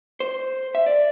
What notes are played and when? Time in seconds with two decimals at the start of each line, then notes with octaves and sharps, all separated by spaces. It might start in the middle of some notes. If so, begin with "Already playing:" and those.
0.20 C5
0.75 E5
0.86 D5